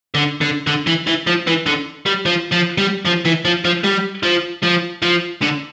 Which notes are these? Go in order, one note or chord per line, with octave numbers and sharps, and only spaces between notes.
D3
D3
D3
E3
E3
F3
E3
D3
G3
F3
F3
G3
F3
E3
F3
F3
G3
F3
F3
F3
D3